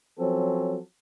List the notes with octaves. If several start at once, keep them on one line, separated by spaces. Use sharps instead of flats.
F3 F#3 C4 C#4 A4